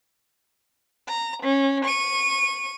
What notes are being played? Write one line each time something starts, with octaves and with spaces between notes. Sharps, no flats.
A#5
C#4
C#6 D#7